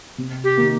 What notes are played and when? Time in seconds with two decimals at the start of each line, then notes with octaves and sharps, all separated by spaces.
0.18 C3
0.44 G4
0.57 D#3 A#3